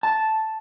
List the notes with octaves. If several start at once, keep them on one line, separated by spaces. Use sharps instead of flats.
A5